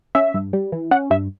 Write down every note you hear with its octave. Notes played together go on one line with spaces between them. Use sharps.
C#4 E5
G2
G3
E3
C#4 F#5
G2 E5